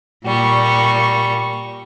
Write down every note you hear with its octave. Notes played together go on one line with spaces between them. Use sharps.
A#2 G3 C#6